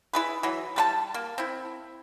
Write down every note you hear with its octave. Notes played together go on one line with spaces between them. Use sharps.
E4 G#4 B4
E3 F#3
G3 B4 A5
A#3
C4 E4